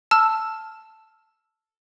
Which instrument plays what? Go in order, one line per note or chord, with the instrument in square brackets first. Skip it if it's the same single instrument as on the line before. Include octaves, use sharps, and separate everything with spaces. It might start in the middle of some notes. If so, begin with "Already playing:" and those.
[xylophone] A5 E6 F6